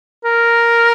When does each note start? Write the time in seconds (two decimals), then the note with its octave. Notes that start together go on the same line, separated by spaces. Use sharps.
0.24 A#4